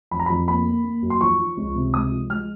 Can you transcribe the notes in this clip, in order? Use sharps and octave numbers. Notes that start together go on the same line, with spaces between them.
F2 B5
A#5
F2 B5
A#3 B5
A#3
A#3
F#2
C6
F3 C#6
F3
C#2
C3
G#3 D#6
F3
G#3 F6